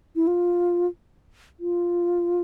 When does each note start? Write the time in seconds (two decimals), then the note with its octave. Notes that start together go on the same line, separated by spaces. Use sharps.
0.16 E4
0.27 F4
1.60 F4